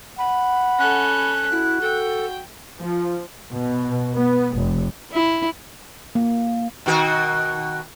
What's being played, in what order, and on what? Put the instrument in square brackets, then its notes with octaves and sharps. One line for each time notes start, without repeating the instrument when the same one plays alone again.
[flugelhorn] F#5 [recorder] B5
[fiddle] C#4 A4 [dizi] F#6
[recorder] E4 [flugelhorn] F#4
[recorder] A4 [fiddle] G5
[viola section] F3
[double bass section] B2
B3
F1
[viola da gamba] E4
[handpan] A#3
[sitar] B2 D#3 F#4